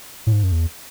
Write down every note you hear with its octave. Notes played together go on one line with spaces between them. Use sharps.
A2
G#2
F#2
E2